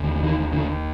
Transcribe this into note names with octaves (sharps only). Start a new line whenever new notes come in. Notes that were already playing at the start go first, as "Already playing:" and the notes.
Already playing: D#2 D3
D#3
D3